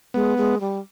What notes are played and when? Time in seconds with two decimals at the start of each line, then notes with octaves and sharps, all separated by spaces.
0.14 G#3 B3
0.38 G#3
0.60 G3